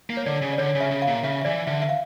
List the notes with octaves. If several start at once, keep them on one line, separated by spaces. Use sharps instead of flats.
A#3
C#5
D3 D5
C#3
D5
D3 C#5
C#3
E5
C#3
F5
A#2
C#3 E5
E5
E3 D5
D3 E5
E5
F5